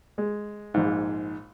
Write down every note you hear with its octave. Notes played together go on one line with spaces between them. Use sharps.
G#3
A#1 G#2